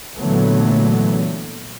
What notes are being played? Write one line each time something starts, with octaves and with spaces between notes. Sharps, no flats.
A#2 D3 E3 F#3 A3 B3